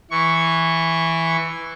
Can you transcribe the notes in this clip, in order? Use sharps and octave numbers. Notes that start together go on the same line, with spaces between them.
E3 C#6